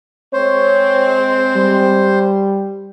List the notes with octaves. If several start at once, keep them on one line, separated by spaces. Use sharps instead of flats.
G#3 C4 C5 C#5
G3